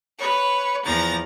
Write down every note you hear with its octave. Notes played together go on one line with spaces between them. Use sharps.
B4 C#5
E2 F3 A#5 A6